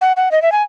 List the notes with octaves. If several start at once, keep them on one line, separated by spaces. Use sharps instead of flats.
F#5
F#5
D#5
E5
G#5